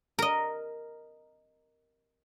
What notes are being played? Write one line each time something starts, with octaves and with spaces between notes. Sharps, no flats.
A#4 D#5